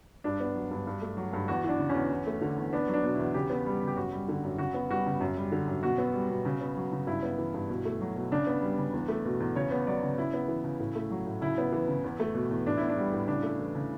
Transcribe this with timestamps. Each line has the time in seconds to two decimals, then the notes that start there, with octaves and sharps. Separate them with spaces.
0.24 G2 D4
0.40 B3
0.55 F#3
0.71 G2
0.87 G2
1.02 A3
1.17 F#3
1.33 G2
1.48 E2 F#4
1.64 E3 D4
1.79 C#3
1.89 C#4
1.94 E2
2.10 E2
2.27 A3
2.41 D3
2.57 E2
2.73 B3 D4
2.88 F#3
2.94 D4
3.03 B2
3.14 E2 E4
3.34 C#3 G4
3.50 B3
3.66 G3
3.82 C#3
3.87 G4
3.96 F#2 F#4
4.13 G3
4.28 D3
4.44 F#2
4.58 C#3 F#4
4.74 B3
4.90 G3 F#4
5.06 C#3
5.21 F#2
5.37 G3
5.52 D3
5.68 F#2
5.83 B2 F#4
5.98 B3
6.13 G3
6.30 B2
6.45 C#3
6.61 B3
6.77 F#3
6.92 C#3
7.07 G2 E4
7.23 B3
7.38 E3
7.54 G2
7.69 B2
7.85 A3
8.01 F#3
8.16 B2
8.32 C#3 D4
8.47 B3
8.62 G3
8.78 C#3
8.93 E2
9.08 A3
9.25 B2
9.40 E2
9.55 C#3 C#5
9.71 B3
9.87 F#3 D5
10.03 C#3
10.18 C#3 E4
10.33 B3
10.48 E3
10.64 C#3
10.79 A2
10.95 A3
11.11 F#3
11.27 A2
11.41 C#3 E4
11.58 B3
11.72 E3
11.88 C#3
12.04 E2
12.20 A3
12.34 B2
12.51 E2
12.67 A2 D4
12.77 B3 E4
12.89 D4
12.97 G3
13.13 A2
13.27 C#3 D4
13.43 A3
13.59 E3
13.75 C#3